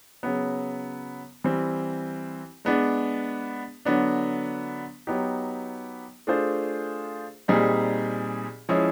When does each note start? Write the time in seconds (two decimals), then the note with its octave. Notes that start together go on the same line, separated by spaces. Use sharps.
0.23 C#3 F#3 B3
1.44 E3 G3 C4
2.65 G#3 B3 D4
3.85 D3 F#3 B3 D4
5.07 F#3 B3 D#4 G4
6.27 A3 D4 F4 G#4 C5
7.48 A#2 G3 C4 D#4 G#4
8.69 F3 G#3 C#4 E4 G#4